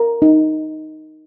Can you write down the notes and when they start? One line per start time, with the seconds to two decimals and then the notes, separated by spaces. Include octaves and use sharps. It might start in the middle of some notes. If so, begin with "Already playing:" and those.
Already playing: A#4
0.22 D#4